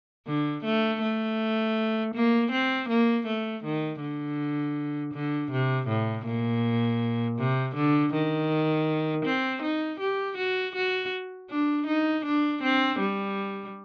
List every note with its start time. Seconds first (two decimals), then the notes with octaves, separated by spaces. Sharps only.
0.27 D3
0.65 A3
1.02 A3
2.15 A#3
2.52 C4
2.89 A#3
3.27 A3
3.64 D#3
4.01 D3
5.14 D3
5.51 C3
5.88 A2
6.26 A#2
7.38 C3
7.75 D3
8.13 D#3
9.25 C4
9.62 D#4
10.00 G4
10.38 F#4
10.75 F#4
11.50 D4
11.87 D#4
12.25 D4
12.63 C4
13.00 G3